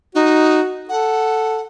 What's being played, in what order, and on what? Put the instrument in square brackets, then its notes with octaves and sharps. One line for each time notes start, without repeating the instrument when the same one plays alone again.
[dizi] D#4 [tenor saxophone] F#4
[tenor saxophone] A4 [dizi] F#5